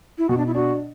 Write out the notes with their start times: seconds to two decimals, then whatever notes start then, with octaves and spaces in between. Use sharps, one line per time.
0.18 E4
0.29 B2 F#4
0.37 D4
0.47 E4
0.55 D4 F#4